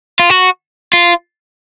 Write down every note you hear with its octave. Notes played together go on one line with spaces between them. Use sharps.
F4
F#4
F4